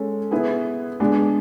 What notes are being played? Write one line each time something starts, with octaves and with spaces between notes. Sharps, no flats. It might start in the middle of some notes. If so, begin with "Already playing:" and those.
Already playing: G#3 C#4 A4
B3 E4 G#4 B4
G#3 B3 D4